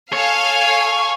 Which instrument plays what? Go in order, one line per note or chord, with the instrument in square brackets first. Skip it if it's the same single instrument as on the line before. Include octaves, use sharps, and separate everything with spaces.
[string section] A4 F5 G#5 [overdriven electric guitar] C#5